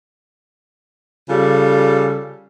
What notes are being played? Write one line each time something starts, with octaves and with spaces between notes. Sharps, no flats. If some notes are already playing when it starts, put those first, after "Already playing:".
C#3 G3 F4 A4